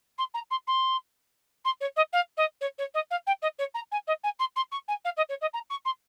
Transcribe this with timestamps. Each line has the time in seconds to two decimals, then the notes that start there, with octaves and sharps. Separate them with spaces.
0.18 C6
0.34 A#5
0.50 C6
0.67 C6
1.64 C6
1.80 C#5
1.96 D#5
2.13 F5
2.37 D#5
2.61 C#5
2.78 C#5
2.94 D#5
3.10 F5
3.27 G5
3.42 D#5
3.58 C#5
3.74 A#5
3.92 G#5
4.07 D#5
4.23 G#5
4.39 C6
4.56 C6
4.71 C#6
4.88 G#5
5.04 F5
5.17 D#5
5.29 C#5
5.41 D#5
5.53 A#5
5.70 C#6
5.85 C6